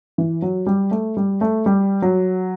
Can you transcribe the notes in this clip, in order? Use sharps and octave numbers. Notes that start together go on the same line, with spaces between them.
E3
F#3
G3
A3
G3
A3
G3
F#3